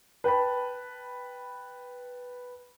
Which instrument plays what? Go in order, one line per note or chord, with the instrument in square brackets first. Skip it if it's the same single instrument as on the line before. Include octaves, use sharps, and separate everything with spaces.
[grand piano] B4 G5 A5 B5